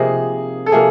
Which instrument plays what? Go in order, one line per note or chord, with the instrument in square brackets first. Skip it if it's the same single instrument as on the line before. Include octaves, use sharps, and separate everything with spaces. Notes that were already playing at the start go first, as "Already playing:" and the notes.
Already playing: [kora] C3 F3 A#3 D#4 [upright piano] G#4
[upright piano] A4
[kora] C3 F3 A#3 [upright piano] G#4